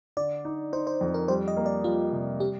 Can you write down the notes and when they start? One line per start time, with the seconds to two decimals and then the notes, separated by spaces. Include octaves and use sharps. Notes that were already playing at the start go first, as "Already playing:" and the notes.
0.17 D3 D5
0.45 D#4
0.73 D#4 C5
0.87 C5
1.01 F2
1.14 A#4
1.28 G3 C5
1.48 D#5
1.57 A#3
1.66 D5
1.84 G3 F4
2.12 C3
2.40 G3 G4